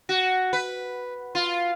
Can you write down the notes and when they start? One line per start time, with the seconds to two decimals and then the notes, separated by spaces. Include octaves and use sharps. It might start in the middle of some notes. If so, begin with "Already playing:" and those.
0.09 F#4
0.53 B4
1.35 F4